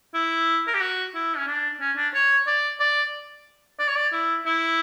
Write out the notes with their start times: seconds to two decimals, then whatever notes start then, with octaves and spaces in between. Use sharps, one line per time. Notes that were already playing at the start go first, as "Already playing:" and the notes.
0.14 E4
0.67 A#4
0.74 G4
0.81 F#4
1.15 E4
1.37 C#4
1.48 D4
1.80 C#4
1.97 D4
2.14 C#5
2.47 D5
2.80 D5
3.79 D5
3.88 C#5
3.96 D5
4.13 E4
4.46 E4